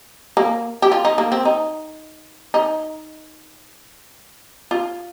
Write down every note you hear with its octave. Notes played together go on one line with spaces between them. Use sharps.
A#3
G4
F4
D#4
A#3
C4
D#4
D#4
F4